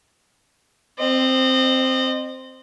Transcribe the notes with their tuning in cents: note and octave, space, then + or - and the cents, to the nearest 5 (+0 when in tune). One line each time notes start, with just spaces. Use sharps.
C4 +0 D#5 -30